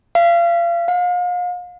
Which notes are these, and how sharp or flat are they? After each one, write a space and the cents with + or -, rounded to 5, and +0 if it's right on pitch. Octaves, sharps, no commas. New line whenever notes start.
F5 -35
F5 +40